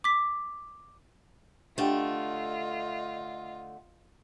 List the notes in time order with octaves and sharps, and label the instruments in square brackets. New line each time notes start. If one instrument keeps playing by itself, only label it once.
[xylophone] D6 B6
[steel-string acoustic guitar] D3 A3 [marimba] D4 G4 G5 [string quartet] F4 D#5